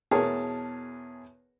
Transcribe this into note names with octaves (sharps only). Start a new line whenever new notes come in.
E2 B2 G#4 A#4 C#5 A5